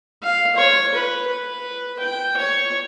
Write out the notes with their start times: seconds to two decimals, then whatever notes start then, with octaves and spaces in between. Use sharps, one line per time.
0.23 F5
0.56 C#5
0.94 B4
1.27 B4
1.99 G5
2.37 C#5